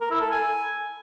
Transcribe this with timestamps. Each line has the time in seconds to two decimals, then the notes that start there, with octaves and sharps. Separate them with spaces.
0.01 A#4
0.11 E4
0.21 A4
0.31 G#5